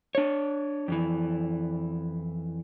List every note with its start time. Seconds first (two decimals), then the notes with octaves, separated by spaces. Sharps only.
0.15 D4 C#5
0.88 F2 E3